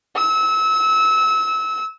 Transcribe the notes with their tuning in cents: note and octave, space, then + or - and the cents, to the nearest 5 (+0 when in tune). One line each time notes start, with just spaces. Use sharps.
E6 -30